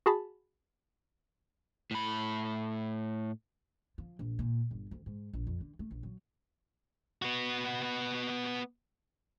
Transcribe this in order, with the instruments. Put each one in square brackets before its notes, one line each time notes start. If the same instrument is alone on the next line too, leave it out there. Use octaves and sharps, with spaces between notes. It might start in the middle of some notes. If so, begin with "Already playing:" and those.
[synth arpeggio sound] F#4 G#4 A5 B5
[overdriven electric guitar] A2 B5
[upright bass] F3
A#1
A#2
G1
D2
G#2
A#1
F2
D3
A3
A#1
F#3
[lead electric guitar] B3 F#4